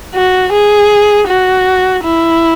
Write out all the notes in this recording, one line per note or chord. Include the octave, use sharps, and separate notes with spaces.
F#4
G#4
F#4
E4